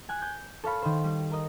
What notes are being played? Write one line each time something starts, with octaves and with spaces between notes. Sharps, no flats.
G#5 F#6
G6
A4 C#5 F5 B5
D#3 C5
G3
A#4 D#5